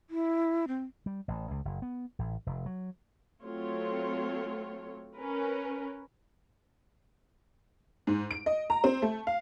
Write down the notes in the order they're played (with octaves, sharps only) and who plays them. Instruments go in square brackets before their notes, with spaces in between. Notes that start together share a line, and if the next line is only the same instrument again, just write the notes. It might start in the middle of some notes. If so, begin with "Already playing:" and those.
[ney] E4
C4
[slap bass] G3
A1
C#2
F#1
B3
A1
F1
F#3
[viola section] F#3 A3 C4 F4 C#5
C#4 A#4 B4
[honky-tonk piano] G#2
D7
D#5
A#5
C4
A3
F5